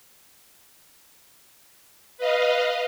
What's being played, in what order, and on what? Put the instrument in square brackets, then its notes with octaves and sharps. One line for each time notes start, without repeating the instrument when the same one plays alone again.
[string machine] B4 D#5 F5